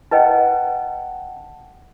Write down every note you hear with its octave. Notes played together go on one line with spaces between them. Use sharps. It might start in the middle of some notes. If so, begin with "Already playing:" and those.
E4 B4 D#5 F#5 G5 A5